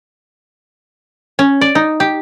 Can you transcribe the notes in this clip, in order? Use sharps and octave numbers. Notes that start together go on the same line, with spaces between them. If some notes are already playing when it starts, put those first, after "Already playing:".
C#4
D5
D#4
G4